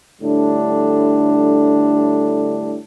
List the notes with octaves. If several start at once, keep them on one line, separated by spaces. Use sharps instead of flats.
A2 D3 G3 D4